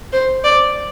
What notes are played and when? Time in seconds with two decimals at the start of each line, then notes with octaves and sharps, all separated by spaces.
0.13 C5
0.44 D5